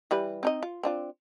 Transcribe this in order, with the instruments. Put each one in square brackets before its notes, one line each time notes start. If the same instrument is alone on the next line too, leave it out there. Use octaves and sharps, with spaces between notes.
[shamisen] E3 G3 B4
C4 D#4 D#5
F4
C4 D4 F4